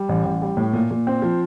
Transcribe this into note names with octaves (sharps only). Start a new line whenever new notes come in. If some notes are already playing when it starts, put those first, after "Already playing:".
Already playing: G3
A1
A1
G3
A2
A#2
A#2
C4
F3